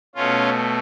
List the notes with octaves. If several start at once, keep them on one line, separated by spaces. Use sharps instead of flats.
B2 A3 C#4 F4